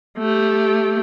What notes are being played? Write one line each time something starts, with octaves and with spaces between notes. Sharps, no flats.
A3 G4